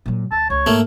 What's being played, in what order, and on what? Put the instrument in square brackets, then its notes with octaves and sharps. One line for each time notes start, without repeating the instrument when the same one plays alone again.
[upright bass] A#2 F#3
[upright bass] D2 [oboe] A5
[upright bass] C#2 [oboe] C#5
[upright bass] G#2 [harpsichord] A3 A#3